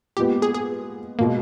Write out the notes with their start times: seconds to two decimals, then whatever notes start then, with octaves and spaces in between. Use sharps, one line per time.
0.17 A#2 G#3 B3 G4
0.42 G#4
0.55 G#4
1.19 B2 G#3 A#3